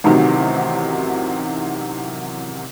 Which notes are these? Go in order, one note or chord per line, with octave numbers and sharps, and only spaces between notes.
A1 C3 D#3 F#3